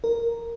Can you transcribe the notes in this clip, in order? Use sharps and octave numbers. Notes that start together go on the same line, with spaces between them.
A#4